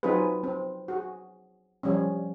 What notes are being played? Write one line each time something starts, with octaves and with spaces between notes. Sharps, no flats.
F#3 C4 D#4 F4 G#4 B4
C4
F#4 G#4
F3 G3 C#4